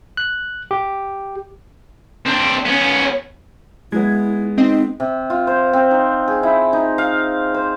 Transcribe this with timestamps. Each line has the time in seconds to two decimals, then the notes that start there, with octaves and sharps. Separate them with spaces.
0.17 F#6
0.71 G4
2.26 C4 D4
2.66 B3 C#4
3.92 G#3 B3 E4 G#6
4.58 C4 D#4 D#5
5.00 C3
5.30 F4
5.47 C5
5.73 C4
5.91 D#4
6.28 G#4
6.43 E4
6.73 D#4
6.98 F5
7.54 C5